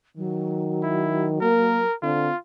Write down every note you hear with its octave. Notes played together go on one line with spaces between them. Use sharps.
D#3 F#3
E4
A#3 A#4
D3 C4 F4